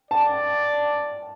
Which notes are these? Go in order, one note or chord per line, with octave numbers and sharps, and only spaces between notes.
D5 A5